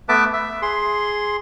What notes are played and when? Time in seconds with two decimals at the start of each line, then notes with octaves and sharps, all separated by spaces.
0.09 A3 B3 B4 E5 A5 D6
0.33 E5
0.62 G#4 C6